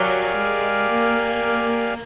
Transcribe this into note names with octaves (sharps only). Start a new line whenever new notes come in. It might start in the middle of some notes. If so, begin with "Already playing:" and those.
Already playing: F#3 G4 A#4 D5 F5 G#5
G#3
A#3